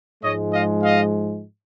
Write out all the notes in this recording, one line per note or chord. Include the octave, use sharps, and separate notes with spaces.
G#2 F3 G#3 C#5 D#5
D#5 F5
D#5 F5